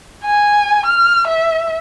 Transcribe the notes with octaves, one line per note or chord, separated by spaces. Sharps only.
G#5
F6
E5